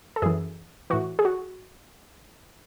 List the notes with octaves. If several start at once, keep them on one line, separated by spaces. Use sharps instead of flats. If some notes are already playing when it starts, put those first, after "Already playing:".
A4
F#2 E3 G#4
A2 E3 F#4
G#4
F#4